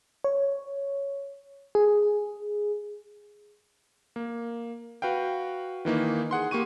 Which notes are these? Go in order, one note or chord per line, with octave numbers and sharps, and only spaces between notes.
C#5
G#4
A#3
F#4 B4 F5 G5
D#3 E3 A#3 D#4
G#4 F#5 C6
A#3 G4 C#6 D#7